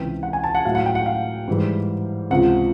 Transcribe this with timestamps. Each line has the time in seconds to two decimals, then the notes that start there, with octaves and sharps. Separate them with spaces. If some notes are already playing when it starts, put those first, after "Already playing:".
Already playing: C#2 C3 E3 G5
0.23 F#5
0.33 G#5
0.44 A5
0.55 F#5
0.65 A2 F#3 F5
0.75 F#5
0.86 G5
0.95 F#5
1.06 F5
1.48 G#2 E3 G3
2.30 C#2 C3 F3 F#5